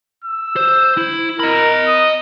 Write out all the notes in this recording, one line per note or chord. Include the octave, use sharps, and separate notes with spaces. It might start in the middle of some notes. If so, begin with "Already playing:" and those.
E6
C5
E4
A#4 D#5 B5
D#6